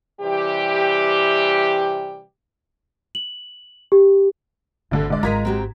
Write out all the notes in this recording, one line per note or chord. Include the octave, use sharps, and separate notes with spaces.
C3 E3 G3 G4
F#7
G4
G1 D2 D3 A4
D3 G#3 D5
G#1 F4 A#4 D#5 A#5 G#6 B6
C4 F#4 G4